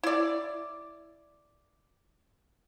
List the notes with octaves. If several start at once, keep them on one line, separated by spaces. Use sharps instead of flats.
E4 D5